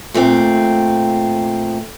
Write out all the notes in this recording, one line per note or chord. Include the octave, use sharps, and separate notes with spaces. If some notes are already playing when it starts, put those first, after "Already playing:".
A#2 A3 C4